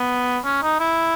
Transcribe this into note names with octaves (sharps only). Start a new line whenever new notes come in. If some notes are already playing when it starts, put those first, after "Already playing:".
Already playing: B3
C#4
D#4
E4